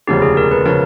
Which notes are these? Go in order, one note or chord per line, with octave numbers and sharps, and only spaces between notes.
E1 D2 C#3 F3 G4
G#4
A#4
B4
C#3 F3 A#4